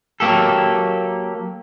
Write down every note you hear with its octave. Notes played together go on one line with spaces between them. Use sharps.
F#3 A#3 G4 A4